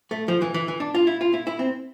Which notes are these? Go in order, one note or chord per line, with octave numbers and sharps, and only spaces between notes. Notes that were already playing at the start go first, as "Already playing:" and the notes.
A3
F3
E3
E3
E3
D4
F4
E4
F4
E4
E4
C4